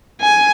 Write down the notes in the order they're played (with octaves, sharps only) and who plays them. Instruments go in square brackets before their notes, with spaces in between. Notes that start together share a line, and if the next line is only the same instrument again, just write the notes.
[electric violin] G#5